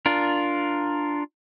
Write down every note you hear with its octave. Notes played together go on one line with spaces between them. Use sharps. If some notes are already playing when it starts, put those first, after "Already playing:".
D4 F4 A#4